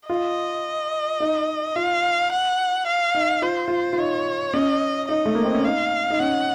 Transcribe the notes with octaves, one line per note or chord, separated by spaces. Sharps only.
F4 D#5
D#4
F4 F5
F#5
F5
D#4
F4 C5
F4
F4
D#4 C#5
C#4 D#5
D#4 D#5
A3
A#3
C4
C#4
D#4 F5
D#4
C#4 F#5